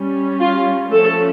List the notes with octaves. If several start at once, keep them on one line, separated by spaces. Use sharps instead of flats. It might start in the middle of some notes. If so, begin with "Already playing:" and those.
Already playing: G3 C#4
F4
F3 A3 C#4 A4